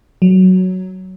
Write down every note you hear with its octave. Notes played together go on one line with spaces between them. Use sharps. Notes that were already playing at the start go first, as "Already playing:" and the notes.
F#3